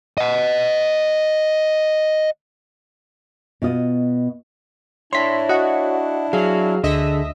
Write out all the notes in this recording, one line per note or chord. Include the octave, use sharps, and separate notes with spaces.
D#5 F#5
B2 F4 D#5
D4 E4 C#5 E5 C6 B6
F#4 D#5 F#5
F#3 G#4 F5
D2 D3 D#5 E5